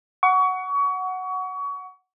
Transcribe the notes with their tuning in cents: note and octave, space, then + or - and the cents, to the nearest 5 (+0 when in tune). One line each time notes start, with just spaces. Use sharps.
F#5 +0 C#6 +30